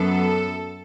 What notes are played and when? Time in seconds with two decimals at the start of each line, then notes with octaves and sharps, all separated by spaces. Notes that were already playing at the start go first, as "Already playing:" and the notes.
Already playing: F#2 F#3 B3 A4